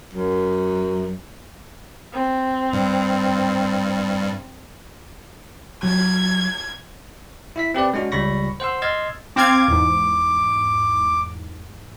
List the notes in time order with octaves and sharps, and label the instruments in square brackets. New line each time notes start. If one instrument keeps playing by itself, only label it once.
[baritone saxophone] F#2
[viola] C4
[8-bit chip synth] G2
[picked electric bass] F#3 [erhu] G#6
[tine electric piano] E4 E5 B6
C4 G4 B4 D5
G#3 C#4 D4 F#4
C#2 G3 B5 C#6 A#6
C5 F#5 C6 E6
D#5 C6 E6 F6 G#6 A6
[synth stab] C4 F5 G#6 [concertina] D6
[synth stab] E2 G#2